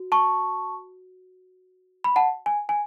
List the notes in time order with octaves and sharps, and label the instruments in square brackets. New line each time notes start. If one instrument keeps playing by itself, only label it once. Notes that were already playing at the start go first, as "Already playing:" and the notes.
Already playing: [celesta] F#4
A5 C#6
B5
F#5 A5
G#5
G#5